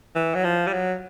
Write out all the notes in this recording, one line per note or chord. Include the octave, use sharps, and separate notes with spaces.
E3
F#3
F3
G3
F#3